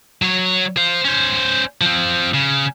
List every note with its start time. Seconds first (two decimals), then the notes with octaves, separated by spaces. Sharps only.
0.22 F#3 C#5
0.77 C5 F5
1.05 C#4 C5
1.81 F3 C4
2.34 C#3